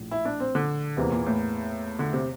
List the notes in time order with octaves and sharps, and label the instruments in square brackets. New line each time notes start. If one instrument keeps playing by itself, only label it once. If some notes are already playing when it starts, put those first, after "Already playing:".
Already playing: [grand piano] A#1 A2
[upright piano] E4
D4
C4
D3
[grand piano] E2 E3 A#3 [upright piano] C3
[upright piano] A#2
A2
D3
C3